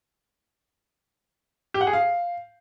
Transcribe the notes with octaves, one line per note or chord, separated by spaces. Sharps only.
G4
F#5
G#4
F5